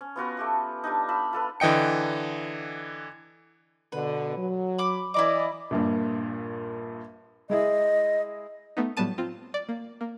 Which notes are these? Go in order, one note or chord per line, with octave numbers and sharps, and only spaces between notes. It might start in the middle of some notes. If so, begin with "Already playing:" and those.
C#4
B3 F4 F#4 B4
A3 G4 C#6
G3 D4 D#4
F4 B5 E6
F4 A4 B4
D3 E3 D#5 G5 C#7
B2 D3 B4
F#3
B5 D6
E3 E4 D5 D#5 B5 D6
A#1 G2 A#2
G#3 E4 G#4 D#5
A3 B3 D#4
A2 F#3 G3 B3 A5 D#7
C4 F4
D5
A#3
A#3